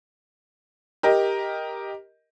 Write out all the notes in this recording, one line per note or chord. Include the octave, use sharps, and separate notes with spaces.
G4 A#4 D#5